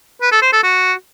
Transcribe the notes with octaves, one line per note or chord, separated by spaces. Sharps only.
B4
A4
C5
A4
F#4